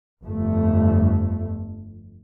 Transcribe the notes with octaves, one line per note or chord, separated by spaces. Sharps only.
G1 F2 A3